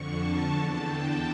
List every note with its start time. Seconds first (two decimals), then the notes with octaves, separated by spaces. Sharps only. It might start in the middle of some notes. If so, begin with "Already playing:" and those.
Already playing: F2 D3 C#6
0.09 A5
0.46 E2 D3
0.82 G5